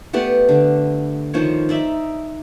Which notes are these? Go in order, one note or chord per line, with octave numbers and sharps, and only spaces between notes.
A3 B3 G4 D5
D3
D#3 F3 C5 C#5
D#4 D5 E5